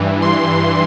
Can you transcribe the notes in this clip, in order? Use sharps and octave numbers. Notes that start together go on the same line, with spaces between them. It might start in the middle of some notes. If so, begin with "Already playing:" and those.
Already playing: G2 E3
C6